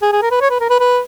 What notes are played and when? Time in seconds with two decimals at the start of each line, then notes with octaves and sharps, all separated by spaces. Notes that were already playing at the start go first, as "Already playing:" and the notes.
0.02 G#4
0.12 G#4
0.22 A#4
0.31 B4
0.41 C#5
0.50 B4
0.60 A#4
0.70 B4
0.80 B4